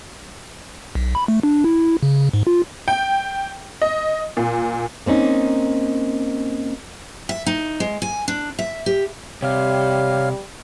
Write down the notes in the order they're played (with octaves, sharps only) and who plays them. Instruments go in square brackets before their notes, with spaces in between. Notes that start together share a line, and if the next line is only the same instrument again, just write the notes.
[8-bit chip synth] B1
B5
A3
D4
E4
C#3
G#2
F4
[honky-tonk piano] G5
D#5
A#2
[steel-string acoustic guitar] A#3 C4 C#4 D#4
E5
D#4
G#3
G#5
D4
E5
G4
[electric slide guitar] C3 [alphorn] G3 [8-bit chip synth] C#5 F5 F6